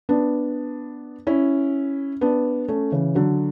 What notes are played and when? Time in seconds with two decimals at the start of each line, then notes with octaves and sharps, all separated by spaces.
0.09 B3 D4
1.27 C#4 E4
2.21 B3 D4
2.68 A3 C#4
2.92 C#3 E3
3.15 D3 F#3